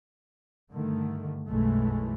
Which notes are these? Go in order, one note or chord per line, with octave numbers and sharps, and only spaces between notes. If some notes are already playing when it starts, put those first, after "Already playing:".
G2 D3 D#3 A3
B1 F#2 E3 G#3 A3